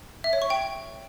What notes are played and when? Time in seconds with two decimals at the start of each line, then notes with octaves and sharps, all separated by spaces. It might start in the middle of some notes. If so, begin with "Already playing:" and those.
0.24 E5
0.33 C#5
0.42 C#6
0.50 G5